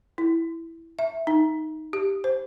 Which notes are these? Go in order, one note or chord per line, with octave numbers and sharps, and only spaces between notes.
E4
E5
D#4
G4
C5